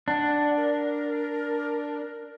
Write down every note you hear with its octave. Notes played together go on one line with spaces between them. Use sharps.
D4 F#5
A#4